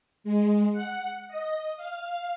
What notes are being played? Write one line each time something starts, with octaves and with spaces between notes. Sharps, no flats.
G#3
F#5
D#5
F5